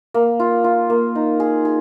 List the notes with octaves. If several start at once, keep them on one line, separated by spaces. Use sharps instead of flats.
A#3
F4
F4
A#3
D#4
G#4
G#4